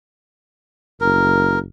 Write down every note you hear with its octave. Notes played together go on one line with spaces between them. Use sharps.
F#1 A#4